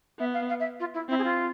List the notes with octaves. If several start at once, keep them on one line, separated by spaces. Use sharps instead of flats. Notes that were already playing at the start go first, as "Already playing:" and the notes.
B3 E5
F5
F5
E5
F4
E4
C4 E4
G#4
F4